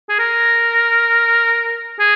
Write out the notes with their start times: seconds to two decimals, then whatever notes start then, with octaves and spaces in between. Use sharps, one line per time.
0.09 G#4
0.19 A#4
1.99 G#4